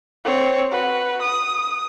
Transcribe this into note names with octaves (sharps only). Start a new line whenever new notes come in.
C4 C#5
F#4 B4
D#6